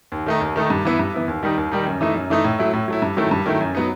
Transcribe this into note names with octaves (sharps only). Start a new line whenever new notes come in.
D#2
D#3 A3 D#4
D#2
D#3 A3 D#4
G2
E3 B3 E4
G2
E3 B3 E4
D#2
D#3 G3 D#4
D#2
D#3 G3 D#4
F#2
E3 A3 D#4
F#2
E3 A3 D#4
A2
F#3 A3 E4
A2
F#3 A3 E4
G2
D#3 F#3 A3 E4
G2
D#3 F#3 A3 E4
F#2
F#3 B3 D#4